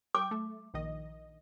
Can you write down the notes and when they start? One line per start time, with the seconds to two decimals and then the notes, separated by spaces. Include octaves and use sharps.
0.15 G5 D6
0.31 A3
0.74 A#1 D#3 D#5